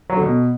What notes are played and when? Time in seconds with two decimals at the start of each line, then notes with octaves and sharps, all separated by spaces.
0.10 F#3
0.16 D3
0.23 B2